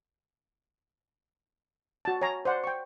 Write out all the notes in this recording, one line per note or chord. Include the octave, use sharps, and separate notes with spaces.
F#4 A5
C#5 G#5 A#5
C5 D5 F#5
G5 C#6